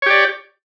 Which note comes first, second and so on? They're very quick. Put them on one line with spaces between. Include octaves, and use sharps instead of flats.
C#5 G4 D5